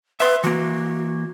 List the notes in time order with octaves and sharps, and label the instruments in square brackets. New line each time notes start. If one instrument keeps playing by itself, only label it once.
[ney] B4 [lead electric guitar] E5 C6
[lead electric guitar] E3 A#3 [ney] F#4